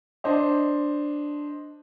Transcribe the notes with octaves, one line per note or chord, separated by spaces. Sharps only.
D4 C5 D#5